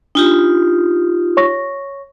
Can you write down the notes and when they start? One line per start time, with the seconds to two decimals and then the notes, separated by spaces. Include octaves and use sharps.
0.15 D4 D#4 F4 G4
1.37 C#5 C#6 A#6